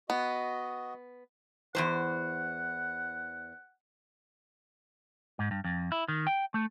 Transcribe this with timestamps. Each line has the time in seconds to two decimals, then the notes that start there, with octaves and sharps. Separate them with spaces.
0.10 B3 F#4 D#5
1.75 E2 G#2 C5 F#5
5.39 G#2
5.51 G2
5.64 F2
5.92 E4
6.08 D#3
6.27 G5
6.54 A3